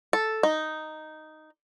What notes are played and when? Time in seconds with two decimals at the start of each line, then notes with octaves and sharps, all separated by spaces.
0.13 A4
0.43 D#4